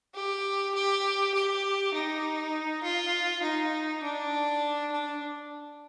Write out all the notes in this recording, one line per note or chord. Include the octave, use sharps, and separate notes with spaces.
G4
G4
G4
D#4
F4
D#4
D4
D4